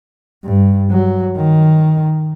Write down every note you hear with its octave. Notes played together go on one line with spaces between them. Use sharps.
G2
F#3
D#3